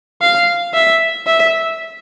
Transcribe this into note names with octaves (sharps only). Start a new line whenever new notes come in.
F5
E5
E5